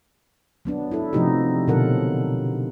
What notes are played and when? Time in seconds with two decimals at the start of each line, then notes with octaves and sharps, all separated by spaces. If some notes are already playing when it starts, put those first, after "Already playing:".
0.65 F#3 B3 D4
0.91 E4 A4
1.13 C3 F3 A3 D#4 F#4 G4
1.68 B2 D3 F#3 A4 A#4 F#5